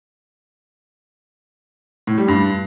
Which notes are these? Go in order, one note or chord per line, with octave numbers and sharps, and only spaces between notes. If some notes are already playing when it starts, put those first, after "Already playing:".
A2
G3
G2